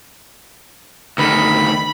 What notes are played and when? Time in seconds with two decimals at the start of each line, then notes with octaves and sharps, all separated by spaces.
1.18 D2 D#3 B5